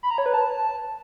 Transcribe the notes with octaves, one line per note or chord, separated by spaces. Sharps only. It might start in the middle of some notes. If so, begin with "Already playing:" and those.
B5
A#5
C#5
B4
A5